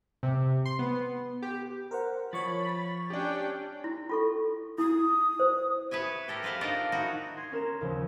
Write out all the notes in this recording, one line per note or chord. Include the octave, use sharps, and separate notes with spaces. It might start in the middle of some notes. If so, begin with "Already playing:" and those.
C3
C6
B3
G4
A#4 C5 F#5
F3 C#5 B5 C#6 A6
C#4 D4 G4 D5 G5
E4
F4 A4 C#6
E4 D#6
C5
B4 C#5 E5 G#5
G4 A4 A#4
A4 B4 C5 F5 F#5
D4 D#4 F4 A4 A#4 D5
D#4 E4 F#4
C6 G#6
C#4 A#4 G#6 E7
D#2 C#3 F3